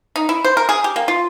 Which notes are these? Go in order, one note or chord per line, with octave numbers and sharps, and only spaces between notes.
D#4
E4
C5
A#4
G#4
G4
A#3
F4